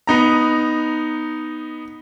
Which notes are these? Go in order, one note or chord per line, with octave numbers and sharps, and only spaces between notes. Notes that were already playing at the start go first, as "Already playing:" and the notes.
B3 D#4 A#5